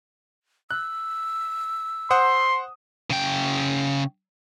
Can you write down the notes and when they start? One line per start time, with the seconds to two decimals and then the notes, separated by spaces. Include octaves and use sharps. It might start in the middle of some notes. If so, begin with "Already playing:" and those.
0.71 E6 F#6
2.10 C5 F#5 C6 D#6
3.10 C#3 G5